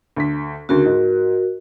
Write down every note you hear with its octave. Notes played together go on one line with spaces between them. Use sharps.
D2 B6
D2 C#3 F#4 A#4
G#2